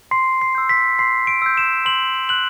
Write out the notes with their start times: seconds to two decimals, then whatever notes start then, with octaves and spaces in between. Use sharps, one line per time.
0.11 C6 C7
0.42 C7
0.55 E6 G6
0.69 B6
0.99 C6 C7
1.27 D7
1.42 E6 G6
1.57 E7
1.86 C6 F#7
2.29 F#6 F#7